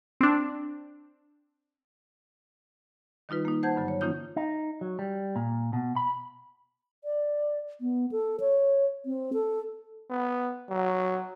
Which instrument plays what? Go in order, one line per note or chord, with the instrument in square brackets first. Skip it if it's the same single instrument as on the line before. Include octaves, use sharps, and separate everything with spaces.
[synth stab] C4 D4
[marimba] D#3 G3 D#4 F4 B4
A#3 D#4
C5 F#5 A5 G6 G#6
G2 D3 F#3
C#5
E3 A#3 C#4 D#4 F4 G6
[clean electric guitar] D#4
F#3
G3
A#2
B2
B5
[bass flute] D5
B3
A4
C#5
C4
A4
[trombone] B3
F#3